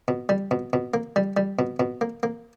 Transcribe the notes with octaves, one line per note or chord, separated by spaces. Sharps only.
B2
G3
B2
B2
A#3
G3
G3
B2
B2
A#3
A#3